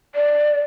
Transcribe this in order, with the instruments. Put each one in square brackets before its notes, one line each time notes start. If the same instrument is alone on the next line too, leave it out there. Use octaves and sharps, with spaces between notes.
[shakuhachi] D5